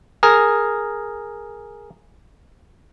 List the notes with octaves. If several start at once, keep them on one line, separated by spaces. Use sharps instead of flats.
G#4 A#4